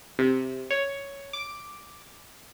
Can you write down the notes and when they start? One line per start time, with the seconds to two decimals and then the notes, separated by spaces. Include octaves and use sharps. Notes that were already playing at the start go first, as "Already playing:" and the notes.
0.19 C3
0.70 C#5
1.33 D6